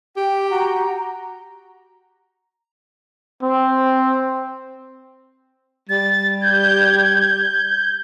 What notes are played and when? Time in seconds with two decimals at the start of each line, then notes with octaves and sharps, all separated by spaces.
0.17 G4 G5
0.51 F#4 A#5
3.43 C4
5.89 G3 A6
6.41 G6 G#6